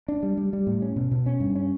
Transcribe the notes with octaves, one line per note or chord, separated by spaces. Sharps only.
D4
G3
G3
G3
A2
C#4
B2
B2
C#4
G2
C#4